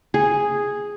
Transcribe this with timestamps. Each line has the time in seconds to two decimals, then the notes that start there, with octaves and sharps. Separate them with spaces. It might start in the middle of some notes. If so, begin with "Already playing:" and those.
0.14 G#4